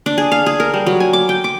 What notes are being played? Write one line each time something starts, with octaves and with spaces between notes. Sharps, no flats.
D4
G#4
F5
G#4
A#4
G3
F#3
G#5
D6
G5
D6